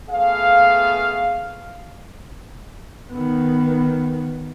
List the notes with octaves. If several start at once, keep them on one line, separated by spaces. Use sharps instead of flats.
A3 B3 G#4 F5
D#3 B3